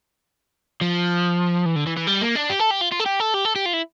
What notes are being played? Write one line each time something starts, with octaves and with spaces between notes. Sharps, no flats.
F3
E3
D3
E3
E3
G3
A#3
D4
G4
A4
G4
F4
F4
A4
G4
A4
G4
A4
G4
F4
E4